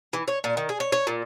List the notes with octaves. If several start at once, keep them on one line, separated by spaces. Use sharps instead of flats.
E3
C#5
A#2
D#3
G#4
C#5
C#5
A#2